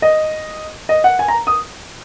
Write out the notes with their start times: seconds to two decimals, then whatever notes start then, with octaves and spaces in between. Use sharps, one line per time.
0.02 D#5
0.89 D#5
1.04 F#5
1.19 G#5
1.28 A#5
1.47 D#6